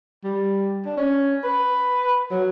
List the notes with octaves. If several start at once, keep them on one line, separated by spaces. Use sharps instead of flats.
G3
D4
C#4
B4
F#3